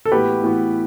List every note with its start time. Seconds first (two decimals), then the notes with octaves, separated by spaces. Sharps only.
0.05 A4
0.11 A2 E3 B3 F#4 G4 B4
0.43 A2 E3 B3 F#4